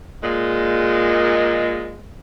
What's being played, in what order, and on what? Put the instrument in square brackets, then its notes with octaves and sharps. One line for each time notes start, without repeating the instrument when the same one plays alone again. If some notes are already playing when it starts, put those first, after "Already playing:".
[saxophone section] A#2 G#3